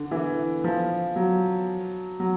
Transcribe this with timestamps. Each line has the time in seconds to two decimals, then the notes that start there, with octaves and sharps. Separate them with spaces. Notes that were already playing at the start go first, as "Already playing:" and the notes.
Already playing: D3
0.11 E3
0.64 F3
1.16 F#3
2.20 F#3